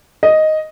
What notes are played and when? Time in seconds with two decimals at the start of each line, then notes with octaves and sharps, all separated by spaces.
0.23 D#5